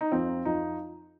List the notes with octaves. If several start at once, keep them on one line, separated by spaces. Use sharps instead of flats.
D#4
F2 F3 C4
F2 F3 D#4